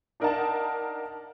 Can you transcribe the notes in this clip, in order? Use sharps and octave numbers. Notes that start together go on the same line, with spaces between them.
D4 D#4 A#4 F5 F#5 A5